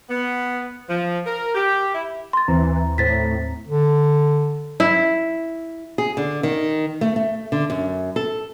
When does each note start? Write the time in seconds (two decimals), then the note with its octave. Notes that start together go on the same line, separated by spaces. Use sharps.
0.09 B3
0.89 F3
1.26 A#4
1.55 G4
1.94 E4
2.33 C6 A6
2.48 D#2 E3 C4 A#5
2.98 A2 C5 A6 B6
3.68 D3
4.80 E4
5.98 G#4
6.17 D3
6.43 D#3
7.01 A3
7.16 A3
7.52 D3
7.70 F#2
8.16 A4